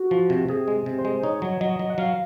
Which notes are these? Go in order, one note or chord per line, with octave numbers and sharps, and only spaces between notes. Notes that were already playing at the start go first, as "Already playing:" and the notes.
Already playing: F#4
F3
C3
C3 G#4
G#3
C3
C5
G#3
D#4 C#5
F#3
F#3 D#5
F#3
F#5
F#3 F5